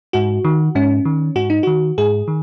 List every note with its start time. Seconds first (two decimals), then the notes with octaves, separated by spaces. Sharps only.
0.13 G#2 F#4
0.45 D#3
0.75 G#2 C#4
1.05 D#3
1.36 G#2 F#4
1.50 D#4
1.63 D#3 F#4
1.98 G#2 G#4
2.28 D#3